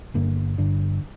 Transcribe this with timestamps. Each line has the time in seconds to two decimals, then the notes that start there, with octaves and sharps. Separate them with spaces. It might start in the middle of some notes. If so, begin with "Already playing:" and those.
0.14 G1 G2 D3 A#3
0.58 G1 G2 D3 D4